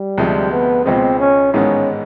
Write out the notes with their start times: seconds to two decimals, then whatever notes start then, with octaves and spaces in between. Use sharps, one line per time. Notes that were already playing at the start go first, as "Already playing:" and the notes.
Already playing: G3
0.18 D2 C3 F3 G#3
0.52 B3
0.86 C#2 B2 G#3 C4
1.20 C#4
1.53 A1 G#2 D#3 G#3 B3 C#4